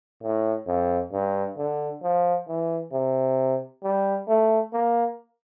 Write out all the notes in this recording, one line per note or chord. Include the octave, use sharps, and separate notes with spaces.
A2
F2
G2
D3
F3
E3
C3
G3
A3
A#3